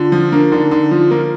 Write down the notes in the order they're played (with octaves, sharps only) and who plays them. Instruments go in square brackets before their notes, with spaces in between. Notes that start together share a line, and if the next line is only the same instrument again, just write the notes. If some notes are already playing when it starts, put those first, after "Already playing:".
Already playing: [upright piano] D3 [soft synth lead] F4
[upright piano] F3
[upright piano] A#3 [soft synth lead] D4
[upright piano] D3 [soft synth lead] D#4
[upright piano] D3 [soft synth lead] D#4
[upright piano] F3 [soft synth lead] F4
[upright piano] A#3 [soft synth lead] A#4